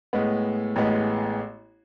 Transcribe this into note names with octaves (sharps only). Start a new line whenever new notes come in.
A2 G#3 B3
A1 A2 G#3 B3